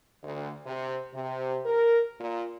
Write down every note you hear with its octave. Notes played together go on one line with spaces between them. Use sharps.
D2
C3
C3
A#4
A#2